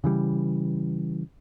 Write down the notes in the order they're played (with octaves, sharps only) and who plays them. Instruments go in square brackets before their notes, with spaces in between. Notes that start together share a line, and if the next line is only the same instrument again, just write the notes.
[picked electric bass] C#3 E3 G3